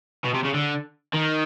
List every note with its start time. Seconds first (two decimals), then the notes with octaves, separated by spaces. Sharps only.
0.24 B2
0.34 C3
0.44 C#3
0.54 D3
1.14 D#3